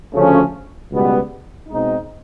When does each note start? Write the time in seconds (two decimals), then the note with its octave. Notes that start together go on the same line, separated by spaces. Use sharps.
0.13 D2 C#3 F3 A3 C#4
0.91 C#2 B2 G3 B3
1.69 B2 G#3 C4 D#4